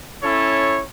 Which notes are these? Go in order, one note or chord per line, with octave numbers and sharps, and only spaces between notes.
C#4 E4 A4 C#5